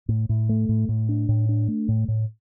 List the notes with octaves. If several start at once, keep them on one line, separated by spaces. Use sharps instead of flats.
A2
A2
A3
A2
A2
D4
A2
D4
A3
A2
A2